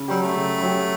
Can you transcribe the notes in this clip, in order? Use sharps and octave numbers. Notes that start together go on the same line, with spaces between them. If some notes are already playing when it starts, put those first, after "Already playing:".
Already playing: C#3
F#3 G3 C#4 G4
A3
C#3
F#3 C#4 G4